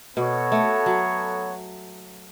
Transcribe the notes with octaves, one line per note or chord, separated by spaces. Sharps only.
B2 B3 F#4 A4 C#5
A3
F#3